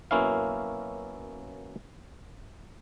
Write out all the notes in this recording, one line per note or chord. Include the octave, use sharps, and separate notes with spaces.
F#2 B2 A#3 C#4 E4 F5